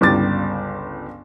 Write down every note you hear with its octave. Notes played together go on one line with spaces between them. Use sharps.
G1 C#2 G3 D6 A6